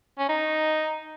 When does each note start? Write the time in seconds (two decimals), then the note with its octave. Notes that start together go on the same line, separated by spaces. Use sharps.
0.18 C#4
0.29 D#4